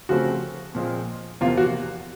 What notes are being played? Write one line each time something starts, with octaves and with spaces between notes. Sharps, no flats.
C#3 F3 A3 C4 F#4
A#2 F3 G#3 C4
E2 C3 F3 A#3 F4
F#4